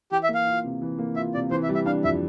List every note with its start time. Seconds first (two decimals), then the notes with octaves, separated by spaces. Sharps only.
0.11 E3 G4
0.23 E5
0.29 A#3
0.34 F5
0.47 F4
0.64 C3
0.82 E3
0.98 A#3
1.16 F4 E5
1.34 C3 D5
1.51 E3 C5
1.63 E5
1.69 G3
1.75 E5
1.86 D4 F5
2.04 F2 E5